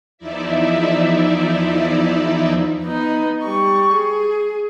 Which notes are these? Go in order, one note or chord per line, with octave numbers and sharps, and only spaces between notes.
E2 F3 D#4 E4 D5 E5
B3 D#4
G3 C#6
G#4